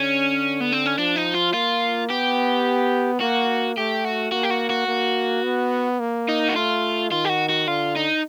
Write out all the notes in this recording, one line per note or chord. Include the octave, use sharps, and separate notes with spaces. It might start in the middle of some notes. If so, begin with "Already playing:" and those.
Already playing: D3 C#4
B3
C4
C#4
F3 D4
D#4
F4
A#3 F4
B3 G4
A#3 F#4
A3 G4
F#4
A#3 F#4
G4
F#4
F#4
A#3
B3
A#3
D#4
F#4
A3 F4
D#3 F4
G4
F#4
F#4
D3 F4
D#4